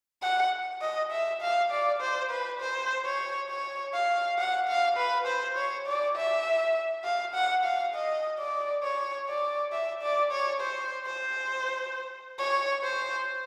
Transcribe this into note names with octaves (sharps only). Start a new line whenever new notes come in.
F#5
D#5
E5
F5
D5
C5
B4
C5
C#5
C#5
F5
F#5
F5
B4
C5
C#5
D5
E5
F5
F#5
F5
D#5
D5
C#5
D5
E5
D5
C#5
C5
C5
C#5
C5